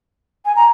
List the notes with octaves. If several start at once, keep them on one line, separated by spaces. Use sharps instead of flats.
G#5
A#5